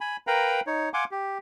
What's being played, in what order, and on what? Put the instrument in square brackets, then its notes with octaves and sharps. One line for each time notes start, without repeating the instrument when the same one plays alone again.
[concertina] G#5 B5
A#4 B4 F5 G5 A#5 B5
D#4 C#5
F5 F#5 G#5 C6 D6
G4